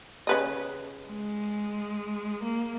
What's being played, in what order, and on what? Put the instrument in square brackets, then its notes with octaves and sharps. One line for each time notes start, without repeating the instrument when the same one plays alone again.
[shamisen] C#3 B4 D#5
[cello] G#3
A#3